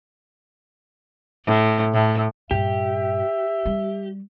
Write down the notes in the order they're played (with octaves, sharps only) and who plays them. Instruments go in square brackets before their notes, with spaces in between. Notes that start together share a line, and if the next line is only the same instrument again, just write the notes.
[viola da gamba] A2
A2
[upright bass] G2 A#2 [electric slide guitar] G4 [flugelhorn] E5
[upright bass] G3